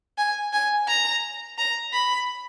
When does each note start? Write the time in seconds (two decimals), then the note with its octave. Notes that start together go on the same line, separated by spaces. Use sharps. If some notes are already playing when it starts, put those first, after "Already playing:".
0.18 G#5
0.53 G#5
0.88 A#5
1.58 A#5
1.93 B5